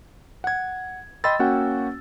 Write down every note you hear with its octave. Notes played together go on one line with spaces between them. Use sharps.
F#5 G#6
D#5 G5 B5 C6 E6 A6
A#3 C#4 F#4 F#5 G5